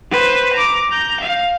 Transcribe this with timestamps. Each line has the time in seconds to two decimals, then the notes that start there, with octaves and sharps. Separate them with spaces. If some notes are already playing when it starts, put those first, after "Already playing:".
0.11 B4 C5
0.53 A#5 D6
0.90 A#5 G6
1.20 F5